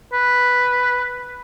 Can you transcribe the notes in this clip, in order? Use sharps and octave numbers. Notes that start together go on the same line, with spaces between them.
B4